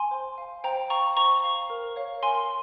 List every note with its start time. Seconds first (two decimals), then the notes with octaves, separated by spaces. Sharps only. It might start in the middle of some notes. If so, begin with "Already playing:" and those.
Already playing: G#5 C6
0.11 C5
0.38 F5
0.64 C5 G5 A#5
0.90 F5 A#5 C#6
1.17 C5 A#5 C#6
1.44 F5
1.70 A#4
1.96 C#5 F5
2.23 A#4 G#5 C6